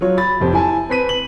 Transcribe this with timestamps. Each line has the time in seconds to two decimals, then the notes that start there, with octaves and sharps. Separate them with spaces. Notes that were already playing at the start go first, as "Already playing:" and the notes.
0.01 F#3 F4 C#5
0.17 B5 A6
0.40 F1 F2 G4 C5
0.53 E4 G#5 A5
0.89 C4 B4 B6 D#7
1.09 F#7